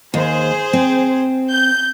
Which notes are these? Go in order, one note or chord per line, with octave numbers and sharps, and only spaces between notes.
D#2 G#4 C5
C4
G6